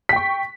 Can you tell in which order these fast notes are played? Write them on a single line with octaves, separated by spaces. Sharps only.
B6 G5 C#6